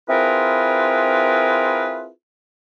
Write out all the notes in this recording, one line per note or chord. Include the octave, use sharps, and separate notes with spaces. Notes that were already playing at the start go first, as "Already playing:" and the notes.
C4 E4 F4 G#4 A#4 B4